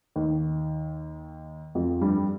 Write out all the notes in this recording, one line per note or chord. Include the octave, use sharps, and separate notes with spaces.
D#2 D#3
F2 F3
G2 G3